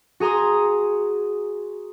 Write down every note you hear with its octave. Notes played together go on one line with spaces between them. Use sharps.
F#4 G#4 A#5 C6 D#6